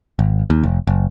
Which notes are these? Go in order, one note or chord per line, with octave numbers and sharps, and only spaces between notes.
G#1
D#2
F1
F#1